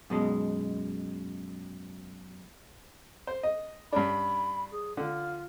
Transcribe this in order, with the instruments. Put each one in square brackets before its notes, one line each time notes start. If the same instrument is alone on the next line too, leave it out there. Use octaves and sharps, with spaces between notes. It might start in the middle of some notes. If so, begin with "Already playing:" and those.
[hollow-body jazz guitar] F#2 B2 G#3
[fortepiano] C5
D#5
[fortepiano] G2 C#4 D4 [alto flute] B5
[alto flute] G#4
[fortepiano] D3 [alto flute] F4